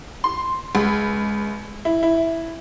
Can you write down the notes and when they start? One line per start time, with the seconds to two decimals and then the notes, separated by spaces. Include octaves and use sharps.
0.24 C6
0.75 C#2
1.85 E4
2.03 E4